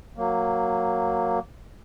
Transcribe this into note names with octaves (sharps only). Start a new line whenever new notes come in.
F#3 A#3